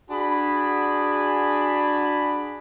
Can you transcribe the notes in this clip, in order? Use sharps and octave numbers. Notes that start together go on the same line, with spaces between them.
D4 F#4 G#4 G#5 B5